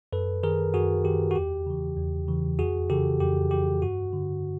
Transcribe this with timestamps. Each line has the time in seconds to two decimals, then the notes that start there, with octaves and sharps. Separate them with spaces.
0.13 F#2 A4 B4
0.43 D#3 G#4 A#4
0.74 F#2 F#4 G#4
1.05 D#3 G4
1.31 F#4
1.35 E2 G4
1.66 C#3 E3
1.97 E2
2.28 C#3 E3
2.59 F2 F#4 G#4
2.90 C#3 E3 G4 A4
3.20 F2 G4
3.51 C#3 E3 G4
3.82 G2 F#4
4.13 D3